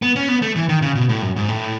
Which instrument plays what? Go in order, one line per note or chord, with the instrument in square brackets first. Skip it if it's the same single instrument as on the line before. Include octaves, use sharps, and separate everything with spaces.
[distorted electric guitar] B3
C#4
B3
A3
E3
D#3
C#3
B2
A2
F#2
G#2
A2